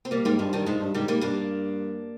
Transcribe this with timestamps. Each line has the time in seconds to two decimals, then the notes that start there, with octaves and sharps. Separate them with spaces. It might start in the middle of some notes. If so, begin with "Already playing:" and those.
0.05 C4
0.11 G3 A#3
0.25 G#2 G3 A#3
0.39 G2 F3 G#3
0.53 G2 D#3 G3
0.66 G#2 F3 G#3
0.80 G2
0.94 G#2 D#3 G3
1.08 G#2 G3 A#3
1.21 G2 A#3 D4